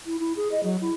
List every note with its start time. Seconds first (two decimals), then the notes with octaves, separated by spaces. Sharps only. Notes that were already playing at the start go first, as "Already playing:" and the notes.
0.06 E4
0.20 E4
0.37 G#4
0.52 D#5
0.64 F#3
0.81 E4